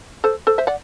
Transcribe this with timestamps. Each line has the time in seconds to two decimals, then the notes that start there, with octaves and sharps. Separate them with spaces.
0.24 A4 C5
0.47 A4 C5
0.58 C5 E5
0.67 D5 F#5